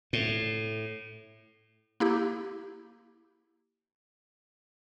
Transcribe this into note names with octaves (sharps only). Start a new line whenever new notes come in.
A2
A#3 E4 G4